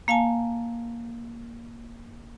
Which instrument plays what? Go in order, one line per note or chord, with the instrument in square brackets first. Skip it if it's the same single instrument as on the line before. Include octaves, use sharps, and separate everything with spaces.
[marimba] A#3 F5 G#5 A5